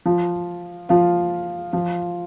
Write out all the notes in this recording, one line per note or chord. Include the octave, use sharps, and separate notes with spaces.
F3 F4
F3 F4
F3 F4